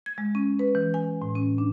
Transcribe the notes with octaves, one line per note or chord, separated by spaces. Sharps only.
G#6
G#3
C#4
B4
E3
G#5
A2
C#4
D4